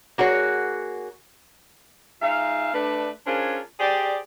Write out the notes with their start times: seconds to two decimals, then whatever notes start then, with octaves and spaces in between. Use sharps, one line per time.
0.18 A#3 F#4 G#4 C#5
2.22 G#3 D#4 F4 E5 F5
2.73 A3 D4 B4
3.27 C#4 D4 F4 G#4 A#4 C5
3.80 G4 G#4 C5 D5